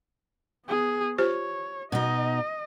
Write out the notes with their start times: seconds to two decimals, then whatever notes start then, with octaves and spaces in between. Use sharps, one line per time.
0.65 B3 G#4
1.18 F4 G4 C5 C#5
1.92 B2 D#4 D#5